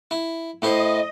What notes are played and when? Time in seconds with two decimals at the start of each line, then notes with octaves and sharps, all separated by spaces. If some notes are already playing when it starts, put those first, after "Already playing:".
0.11 E4
0.62 A2 E4 C5 D#5